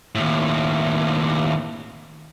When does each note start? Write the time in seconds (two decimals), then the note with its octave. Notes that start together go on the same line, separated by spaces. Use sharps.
0.15 D#2 A2